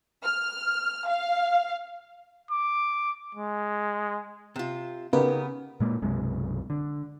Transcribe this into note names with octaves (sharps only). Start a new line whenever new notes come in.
F6
F5
D6
G#3
C3 F4
C#3 B3 D#4 G4 A#4 B4
A#2 G#3 A#3
B1 F#2 C3 G#3
D3